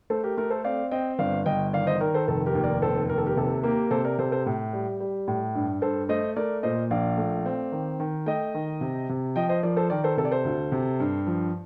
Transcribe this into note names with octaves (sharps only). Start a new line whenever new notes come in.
A3 A4 C5
G4 A#4
A3 G4 A#4
A4 C5
C4 D5 F5
C4 D#5 G5
G1 D5 F5
G1 D#5 G5
D#3 D5 F5
C5 D#5
D#3 A#4 D5
A4 C5
F1 A4
G4 A#4
D#2
A#4 D5
F1 A4 C5
D#2 A#4
A4
G4 A#4
C3 A4
A#3 G4 A#4
A#4
C3 A4 C5
A#4 D5
C3 A4 C5
A4 C5
A2
G3
G3
A2
G2
G2 A4 C5
A3 C5 D#5
A3 A#4 D5
A#2 C5 D#5
A#1 D5 F5
A3
C4
D#3
D#3
A3 D#5 G5
D#3
C3
C3
F3 D#5 G5
C5 D#5
F3 A#4 D5
A4 C5
D#3 A#4 D5
A4 C5
C3 A4
D5
A4 C5
D2
C3
G2
F3